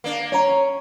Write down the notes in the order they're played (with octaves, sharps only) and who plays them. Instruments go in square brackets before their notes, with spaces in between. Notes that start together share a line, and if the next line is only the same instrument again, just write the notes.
[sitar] A#3 D4
[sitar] C#4 [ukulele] C#5 A#5